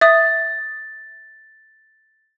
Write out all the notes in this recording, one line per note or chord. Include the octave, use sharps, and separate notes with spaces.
E5 D#6 A6